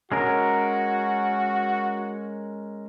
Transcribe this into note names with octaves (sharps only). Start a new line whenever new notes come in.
G#3 C#4 F#4 A#4